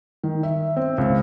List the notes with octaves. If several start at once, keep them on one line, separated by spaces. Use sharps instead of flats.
D#3
E5
C4
C#2